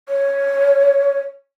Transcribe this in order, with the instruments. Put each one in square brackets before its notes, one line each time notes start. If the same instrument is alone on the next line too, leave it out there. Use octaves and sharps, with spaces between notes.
[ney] C#5